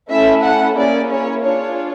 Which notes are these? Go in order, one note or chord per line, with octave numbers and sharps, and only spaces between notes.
A3 C#4 E4 A4 E5
F#5
A#3 C#4 E4 G#4 D5
C#5
D4 F4 G#4 C#5